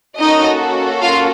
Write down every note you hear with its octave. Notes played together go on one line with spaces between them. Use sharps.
A#3 C#4 D#4 F#4 A4 D#5
F4 F5